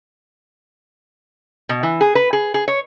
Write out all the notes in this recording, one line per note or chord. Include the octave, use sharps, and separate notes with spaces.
B2
E3
G#4
B4
G#4
G#4
C#5